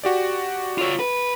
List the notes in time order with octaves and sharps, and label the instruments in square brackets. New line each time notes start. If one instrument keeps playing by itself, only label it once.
[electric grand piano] F#4 G4 D5
[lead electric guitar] F4 C#5
B4